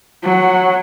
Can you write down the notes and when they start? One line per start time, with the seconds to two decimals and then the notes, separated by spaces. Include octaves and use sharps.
0.23 F#3 F#5